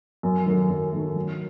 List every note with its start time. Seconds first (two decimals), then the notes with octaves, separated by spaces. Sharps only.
0.23 F#2
0.46 D#3 F#3 A3
0.70 F#2
0.93 D#3 F#3 A3
1.16 F#3